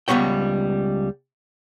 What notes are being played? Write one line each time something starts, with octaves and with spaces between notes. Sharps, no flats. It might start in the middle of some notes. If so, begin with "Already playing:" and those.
C#2 G3 B3 C#5 G5